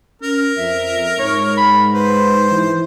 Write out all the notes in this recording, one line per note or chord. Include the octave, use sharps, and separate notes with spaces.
C#4 A#4
F2 E5
G#2 C#5
B5
B4 C5
E3